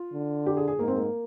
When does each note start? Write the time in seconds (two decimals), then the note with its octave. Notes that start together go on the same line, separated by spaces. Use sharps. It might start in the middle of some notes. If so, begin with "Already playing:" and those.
Already playing: F4
0.13 D3
0.46 G4
0.57 G#4
0.68 G#4
0.79 G#2 A#3
0.88 C4
0.96 A#3